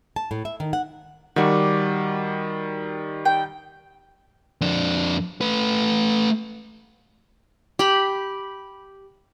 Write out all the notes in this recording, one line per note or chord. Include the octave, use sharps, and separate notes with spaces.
A5
A2
E5
D#3
F#5
D#3 G3 F#4 D5
G5
F2 D4
A3 B4
G4 B5